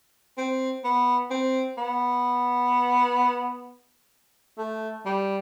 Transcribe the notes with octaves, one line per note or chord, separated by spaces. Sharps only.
C4
B3
C4
B3
A3
G3